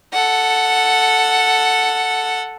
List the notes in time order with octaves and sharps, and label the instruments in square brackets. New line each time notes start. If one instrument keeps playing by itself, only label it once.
[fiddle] A4 F#5